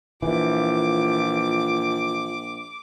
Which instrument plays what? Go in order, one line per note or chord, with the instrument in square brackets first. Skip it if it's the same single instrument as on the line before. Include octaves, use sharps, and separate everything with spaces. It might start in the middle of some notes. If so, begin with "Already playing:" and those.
[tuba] A#1 [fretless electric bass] E3 [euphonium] F4 [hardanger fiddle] D6